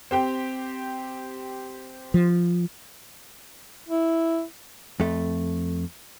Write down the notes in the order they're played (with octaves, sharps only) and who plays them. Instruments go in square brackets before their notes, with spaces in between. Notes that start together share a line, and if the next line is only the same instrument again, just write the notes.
[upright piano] C4 G4 G5
[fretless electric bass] F3
[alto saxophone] E4
[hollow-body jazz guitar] F2 A3